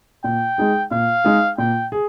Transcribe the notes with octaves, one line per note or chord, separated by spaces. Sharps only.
A#2 G5
G#3 D#4 G#4
A#2 F5
G#3 D#4 G#4
A#2 G5
G#4